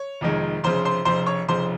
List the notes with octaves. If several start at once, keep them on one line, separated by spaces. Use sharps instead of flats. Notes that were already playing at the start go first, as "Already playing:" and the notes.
Already playing: C#5
F1 F2 D#3 G#3
F1 F2 C#3 C5 C6
C5 C6
F1 F2 C#3 C5 C6
C#5 C#6
F1 F2 C#3 C5 C6